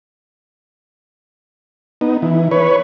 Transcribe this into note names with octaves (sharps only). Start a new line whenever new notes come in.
B3 D#4
E3
B4 C#5